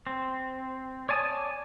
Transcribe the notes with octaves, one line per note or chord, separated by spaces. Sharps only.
C4
C#5 D5 G#5 A5 D#6